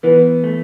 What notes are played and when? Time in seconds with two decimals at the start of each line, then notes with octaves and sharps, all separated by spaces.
0.03 E3 B3
0.44 A3